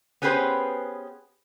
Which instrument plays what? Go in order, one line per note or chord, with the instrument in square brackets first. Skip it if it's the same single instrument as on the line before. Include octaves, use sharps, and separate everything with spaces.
[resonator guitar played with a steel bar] B3 C#4 G4 G#4 B4 C5